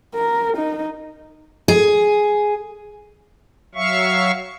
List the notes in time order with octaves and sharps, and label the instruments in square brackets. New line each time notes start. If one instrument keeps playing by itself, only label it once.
[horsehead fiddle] A#4
D#4
[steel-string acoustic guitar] G#4
[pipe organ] F#3 E5 F5 C#6